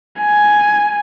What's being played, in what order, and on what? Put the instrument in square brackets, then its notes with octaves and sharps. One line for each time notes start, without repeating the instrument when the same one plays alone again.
[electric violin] G#5